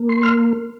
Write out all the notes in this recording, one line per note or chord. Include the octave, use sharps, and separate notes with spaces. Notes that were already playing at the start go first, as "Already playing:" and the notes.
Already playing: A#3
C6
F6